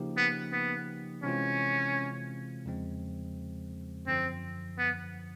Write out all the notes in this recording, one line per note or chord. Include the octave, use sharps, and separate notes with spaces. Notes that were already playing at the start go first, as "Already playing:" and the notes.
Already playing: C#3 F3 A#3 D#4 G4
B3
B3
C3 E3 G#3 C4 C#4 F4
E2 C#3 F3 G#3 C4
F#2 D3 F3 C4
B3